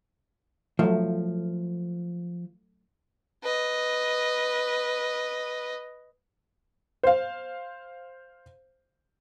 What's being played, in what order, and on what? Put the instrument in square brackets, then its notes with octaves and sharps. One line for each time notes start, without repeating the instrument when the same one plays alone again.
[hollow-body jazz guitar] F3 [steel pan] F#3 A3
[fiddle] B4 D#5
[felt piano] C5 F5